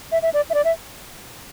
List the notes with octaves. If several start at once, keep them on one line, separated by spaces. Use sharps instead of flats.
E5
E5
D5
E5
D5
E5